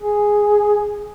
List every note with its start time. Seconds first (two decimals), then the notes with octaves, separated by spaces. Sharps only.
0.01 G#4